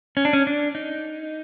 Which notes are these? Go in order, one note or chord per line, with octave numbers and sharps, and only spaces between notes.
C#4
D4
C#4
D4
D#4